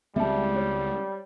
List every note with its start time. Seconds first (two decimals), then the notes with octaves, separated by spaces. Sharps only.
0.16 C#2 G3 G#3 C4 E5 A5
0.56 C#5